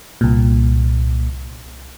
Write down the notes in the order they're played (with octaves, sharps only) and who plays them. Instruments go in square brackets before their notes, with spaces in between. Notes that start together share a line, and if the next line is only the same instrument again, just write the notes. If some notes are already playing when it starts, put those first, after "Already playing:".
[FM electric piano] C2 A#2